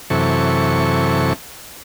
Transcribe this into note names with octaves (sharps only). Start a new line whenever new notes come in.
F#2 C3 E3 A4 C#6